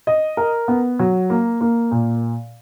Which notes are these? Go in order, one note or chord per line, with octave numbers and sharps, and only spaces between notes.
D#5
A#4
B3
F#3
A#3
A#3
A#2